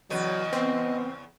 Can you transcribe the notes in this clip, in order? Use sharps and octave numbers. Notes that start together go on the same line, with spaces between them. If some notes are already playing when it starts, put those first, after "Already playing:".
E2 C#3 F#3 B4 D#5
B3 C4